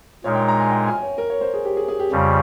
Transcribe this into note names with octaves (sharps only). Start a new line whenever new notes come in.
A#2 G#3 D#4 A#4 C#5
G5
A#5
G#5
G5
G#5
C#5
A#4
C#5
C5
G#4
G4
G#4
G#4
G4
F2 C#3 G3